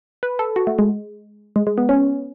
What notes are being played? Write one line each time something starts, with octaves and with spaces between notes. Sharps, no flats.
B4
A4
F#4
A3
G#3
G#3
G#3
B3
C#4